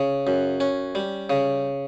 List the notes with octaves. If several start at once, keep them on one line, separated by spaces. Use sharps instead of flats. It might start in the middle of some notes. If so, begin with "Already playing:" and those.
Already playing: C#3
F#2
C#4
G3
C#3